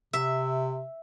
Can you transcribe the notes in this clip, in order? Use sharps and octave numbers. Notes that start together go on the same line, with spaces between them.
C3 E5